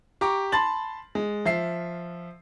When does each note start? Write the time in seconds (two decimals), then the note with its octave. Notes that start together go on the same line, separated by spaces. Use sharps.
0.21 G4 A#5 C#6 D6
0.52 A5 B5 C6 A6 F#7
1.15 G#3
1.45 F3 E5 C7